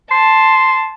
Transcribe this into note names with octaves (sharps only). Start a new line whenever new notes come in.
A5 C6